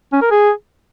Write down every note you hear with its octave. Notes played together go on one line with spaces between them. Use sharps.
C#4
A#4
G#4